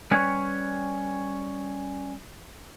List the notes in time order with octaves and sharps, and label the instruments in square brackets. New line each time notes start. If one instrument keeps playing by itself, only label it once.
[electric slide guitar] G3 C#4 B4 C#5